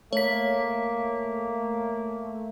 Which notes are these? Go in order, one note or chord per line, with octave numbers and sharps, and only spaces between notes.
A3 A#3 C#5 B6